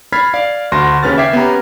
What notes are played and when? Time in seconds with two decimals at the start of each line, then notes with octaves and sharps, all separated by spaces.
0.12 B5 F6 G#6 A6 B6 C7
0.33 D5 F5 C7
0.72 D2 F#4 C6 A#6
1.03 D#2 C#3 C#4 B4 F6 A6
1.18 E5 G5 D6 G#6 B6 C7
1.33 B3 C#4 G4 A#5